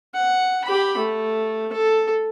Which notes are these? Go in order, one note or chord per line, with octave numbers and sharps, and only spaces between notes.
F#5
G4 B5
A3
A4